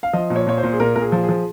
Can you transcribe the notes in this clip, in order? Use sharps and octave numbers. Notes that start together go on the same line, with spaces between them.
F5
F3 D#5
A#2
C#5
A#2 C#5
C5
A#2
G#4
A#2 A#4
A#2 A#4
G#4
F3
G#4
F3